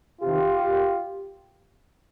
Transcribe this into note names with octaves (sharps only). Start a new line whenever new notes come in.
C3 D#3 F4 G4
A#2